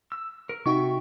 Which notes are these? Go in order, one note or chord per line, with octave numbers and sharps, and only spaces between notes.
E6
A#4
C3 D#4 F#4 E5 G5 C#6